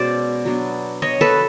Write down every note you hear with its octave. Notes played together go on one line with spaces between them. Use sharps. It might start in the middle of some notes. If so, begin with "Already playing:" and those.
Already playing: B2 G#3 C#4 C5 D5
F#3 B3 D4
C#5 D#5
A4 B4